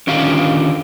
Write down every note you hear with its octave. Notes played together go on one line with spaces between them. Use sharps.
D3 D#3 C#4 F4 G4 F5